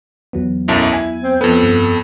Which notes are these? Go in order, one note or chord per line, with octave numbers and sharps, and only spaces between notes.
E2 F#3 B3
B1 F#2 E4 A5
G#5
C4
F2 B3 A4 B4
G2